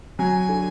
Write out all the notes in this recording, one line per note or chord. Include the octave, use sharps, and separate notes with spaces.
F#3 G#5
D3